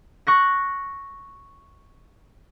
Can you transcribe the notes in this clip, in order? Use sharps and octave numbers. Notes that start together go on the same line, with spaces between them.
C#6 F#6 A#6